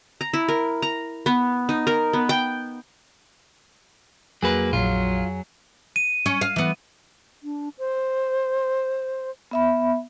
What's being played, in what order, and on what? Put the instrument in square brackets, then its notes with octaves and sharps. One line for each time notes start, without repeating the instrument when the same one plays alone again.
[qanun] A#5
E4
A#4
A#5
B3
D#4
A#4
B3
G5
[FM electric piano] F2 G#4 G#5 [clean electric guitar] F#3 A#3 B4
[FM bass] A#1 [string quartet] F#3 [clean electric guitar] F4
[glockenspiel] D#7
[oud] C#4
F5
E3 B3
[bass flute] D4
C5
[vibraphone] B3 E5 B5